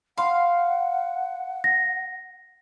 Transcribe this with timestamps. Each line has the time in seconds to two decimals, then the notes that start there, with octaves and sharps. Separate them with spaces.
0.17 F5 F#5 B5 C6
1.64 A#6